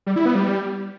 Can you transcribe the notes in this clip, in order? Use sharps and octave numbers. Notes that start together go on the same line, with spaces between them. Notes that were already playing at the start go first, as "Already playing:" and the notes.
G3
E4
B3
G3